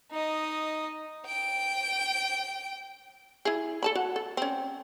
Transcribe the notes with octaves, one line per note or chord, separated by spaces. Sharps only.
D#4 D#5
G5 D7
E4 G#4
A4 A5 B5
F#4 F#5
A4
C4 C#4